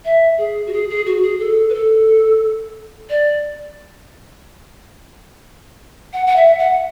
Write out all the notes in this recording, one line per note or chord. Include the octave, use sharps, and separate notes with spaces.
E5
G#4
F#4
G#4
G#4
F#4
G#4
A4
B4
A4
D5
F#5
F#5
E5
F#5